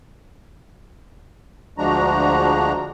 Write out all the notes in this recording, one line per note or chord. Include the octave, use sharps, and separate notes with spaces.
D2 F3 G#3 D4 F#4 A#5